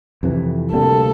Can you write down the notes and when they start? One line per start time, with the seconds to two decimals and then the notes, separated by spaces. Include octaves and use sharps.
0.23 F2 C3 E3
0.73 D2 C3 G3 A#3 A4